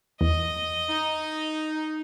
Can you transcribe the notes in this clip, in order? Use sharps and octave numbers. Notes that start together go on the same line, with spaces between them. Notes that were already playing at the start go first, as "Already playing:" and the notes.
E2 D#5
D#4